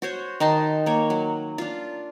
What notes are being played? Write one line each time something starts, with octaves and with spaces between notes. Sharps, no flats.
F#4 C5 C#5
D#3 D#4 A5 C6
A#3 C#5
F#3
D4 F4